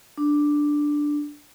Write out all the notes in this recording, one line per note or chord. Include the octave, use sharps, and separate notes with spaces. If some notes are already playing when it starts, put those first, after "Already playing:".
D4